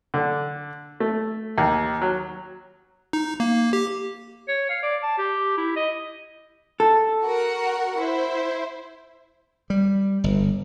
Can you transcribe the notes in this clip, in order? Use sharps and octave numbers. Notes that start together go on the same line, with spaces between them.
D3
A3
D#2
F#3
D#4
A#3
G4
C#5
F5
D5
A5
G4
E4
D#5
A4
F#4 A#4 F#5
E4 C5
G3
G1